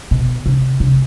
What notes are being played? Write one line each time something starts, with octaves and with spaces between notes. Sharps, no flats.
B2
C3
C3